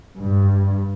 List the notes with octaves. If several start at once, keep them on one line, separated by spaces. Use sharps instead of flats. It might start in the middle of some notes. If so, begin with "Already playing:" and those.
G2